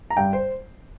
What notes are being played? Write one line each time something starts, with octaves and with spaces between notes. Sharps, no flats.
A#5
G2 G5
C5